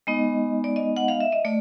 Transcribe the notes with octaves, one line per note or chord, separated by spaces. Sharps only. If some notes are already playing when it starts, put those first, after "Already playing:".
G#3 B3 D#4 D#5
D5
D#5
F#5
F5
E5
D#5
A3 D5